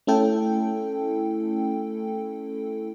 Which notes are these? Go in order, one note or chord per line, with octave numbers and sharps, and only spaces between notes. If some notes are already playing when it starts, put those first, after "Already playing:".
A3 C#4 E4 A4 G5